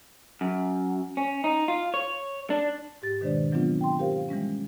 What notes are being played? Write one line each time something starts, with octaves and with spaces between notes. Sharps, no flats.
F#2
C#4
D#4
F4
C#5
D4
G#2 G4 A6
B2 D#3 G#3 D4 C5 D5
E3 F#3 B3 C4 D4 F4
G5 C6
G4 A#4 C5 F5
E3 G3 G#3 C#4